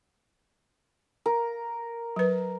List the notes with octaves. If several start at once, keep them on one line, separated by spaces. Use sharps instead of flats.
A#4
F#3 B4